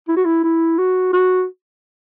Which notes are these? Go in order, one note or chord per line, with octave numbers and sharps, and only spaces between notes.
E4
F#4
E4
E4
F#4
F#4